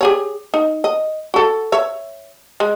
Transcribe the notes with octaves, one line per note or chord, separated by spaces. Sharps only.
G4 G#4 C#5
D#4
D#5
F#4 A4
C#5 E5
G#3